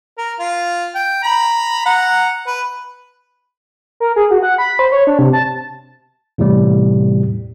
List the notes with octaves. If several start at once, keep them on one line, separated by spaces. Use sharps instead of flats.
A#4
F4
G5
A#5 B5
F#5 A#5
B4
A#4
G#4
F#4
F#5
B5
C5
C#5
D4
C3
A5
E2 A2 C3 G3